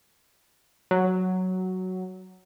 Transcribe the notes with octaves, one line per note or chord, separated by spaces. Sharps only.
F#3